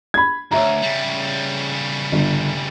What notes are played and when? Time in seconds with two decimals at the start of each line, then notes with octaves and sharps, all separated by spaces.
0.14 B5 G#6
0.51 D2 C#5 E5 A#5
0.82 C#3 G3
2.12 G1